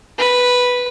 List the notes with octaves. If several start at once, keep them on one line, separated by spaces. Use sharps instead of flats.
B4